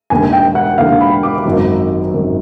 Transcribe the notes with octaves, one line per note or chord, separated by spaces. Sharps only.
E1 D#2 D3 G#5
G5
F#5
E1 D#2 D3 F5
B5
D6
G#1 F#2 D#3 F#3
G#1 F#2 D#3 F#3